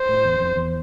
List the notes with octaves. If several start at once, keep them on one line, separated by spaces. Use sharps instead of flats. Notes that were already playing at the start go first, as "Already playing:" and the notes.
Already playing: C5
A2
E2
F2
E2